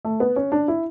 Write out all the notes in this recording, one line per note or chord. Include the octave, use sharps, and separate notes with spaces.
A3
B3
C#4
D4
E4